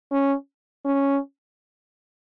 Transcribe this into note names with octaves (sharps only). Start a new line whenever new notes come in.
C#4
C#4